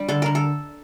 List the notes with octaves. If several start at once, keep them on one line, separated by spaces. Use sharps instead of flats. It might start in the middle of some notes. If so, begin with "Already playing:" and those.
Already playing: G3 D4
D3 A4
D3 A#4
A4